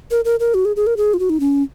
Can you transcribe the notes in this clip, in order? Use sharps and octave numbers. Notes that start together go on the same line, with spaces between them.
A#4
A#4
A#4
F#4
G#4
G#4
A#4
G#4
F4
F#4
D#4
C#4